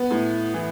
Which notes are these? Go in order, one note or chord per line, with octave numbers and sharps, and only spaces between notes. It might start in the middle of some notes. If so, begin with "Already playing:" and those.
Already playing: B3
A2
E3